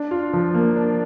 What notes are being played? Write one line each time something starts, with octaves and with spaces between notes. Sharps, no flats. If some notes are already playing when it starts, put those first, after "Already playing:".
Already playing: D4
F4
F3
A#3
D4